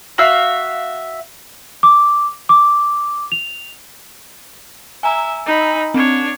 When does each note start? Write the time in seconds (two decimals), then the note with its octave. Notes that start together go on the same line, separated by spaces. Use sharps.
0.18 F#4 E5 F5
1.83 D6
2.49 D6
3.32 F7
5.03 E5 G#5 A#5 E6
5.46 D#4 B5
5.94 C4 D4 C#5